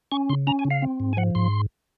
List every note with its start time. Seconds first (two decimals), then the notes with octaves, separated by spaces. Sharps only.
0.12 C#4 C#6
0.29 C#3 C6
0.47 C#4 A#5
0.59 G#5
0.65 C#3
0.71 F5
0.82 C4
1.00 G#2
1.13 G#5
1.17 F3 F#5
1.35 G#2 C6